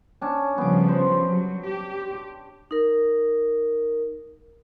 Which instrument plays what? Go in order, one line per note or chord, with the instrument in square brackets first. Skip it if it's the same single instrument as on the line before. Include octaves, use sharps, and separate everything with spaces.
[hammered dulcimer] C#4 D4 A5
[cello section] C#3 F3 G3 [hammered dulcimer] B3 D6
[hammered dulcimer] C5
[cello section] F#3
G4
[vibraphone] D#4 A#4